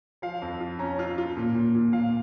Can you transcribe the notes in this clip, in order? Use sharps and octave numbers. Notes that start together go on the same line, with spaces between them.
F3 F5
F2
F4
C#4 A#5
F4
F4
A#2
A#2
A#2
A#2 F5